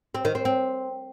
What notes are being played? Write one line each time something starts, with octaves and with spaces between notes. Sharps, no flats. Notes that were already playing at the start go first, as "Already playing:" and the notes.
C4
D#3
C4
C4